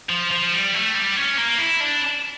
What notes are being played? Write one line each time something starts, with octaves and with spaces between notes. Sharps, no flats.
F3
F3
G3
A3
G3
C#4
A#3
E4
D4